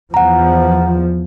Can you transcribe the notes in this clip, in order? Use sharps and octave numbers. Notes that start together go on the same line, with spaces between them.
E2 F3 F#5 A#5